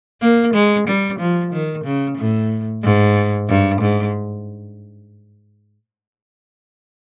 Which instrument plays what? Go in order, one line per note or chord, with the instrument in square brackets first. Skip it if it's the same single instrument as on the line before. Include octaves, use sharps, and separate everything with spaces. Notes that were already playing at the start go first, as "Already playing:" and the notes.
[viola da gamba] A#3
G#3
G3
F3
D#3
C#3
A2
G#2
G2
G#2